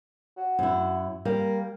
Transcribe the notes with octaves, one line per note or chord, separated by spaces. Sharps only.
F#4
F#2 E4
G3 A#3